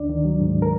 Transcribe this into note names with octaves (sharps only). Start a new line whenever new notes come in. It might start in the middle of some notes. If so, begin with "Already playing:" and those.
Already playing: D2 D4 D5
D#3
F#3
G#2
A#4